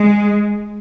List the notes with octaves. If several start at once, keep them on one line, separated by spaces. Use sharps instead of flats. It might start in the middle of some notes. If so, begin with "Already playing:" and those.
Already playing: G#3